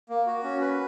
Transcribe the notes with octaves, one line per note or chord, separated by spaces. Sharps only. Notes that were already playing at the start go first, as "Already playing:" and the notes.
A#3
F#4
C#4
B4